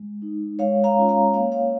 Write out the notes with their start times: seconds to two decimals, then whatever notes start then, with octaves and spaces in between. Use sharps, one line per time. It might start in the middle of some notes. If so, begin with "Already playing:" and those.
Already playing: G#3
0.22 D#4
0.59 G#3 C#5 F5
0.84 F5 A#5
0.97 C#4 F4
1.09 F5 A#5
1.33 A#3 C#5 F5
1.52 C#5 F5